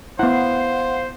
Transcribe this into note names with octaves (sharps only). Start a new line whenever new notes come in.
B3 E4 C5 F5 F#5